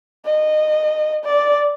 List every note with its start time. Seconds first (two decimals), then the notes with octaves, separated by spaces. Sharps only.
0.26 D#5
1.25 D5